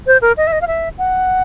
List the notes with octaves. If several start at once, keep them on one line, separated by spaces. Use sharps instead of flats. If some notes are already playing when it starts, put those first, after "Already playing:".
C5
A#4
D#5
E5
D#5
F5
E5
F#5